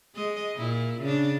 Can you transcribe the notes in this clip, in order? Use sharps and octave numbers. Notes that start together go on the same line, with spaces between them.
G#3 D#5
A#2 E4
C#3 D4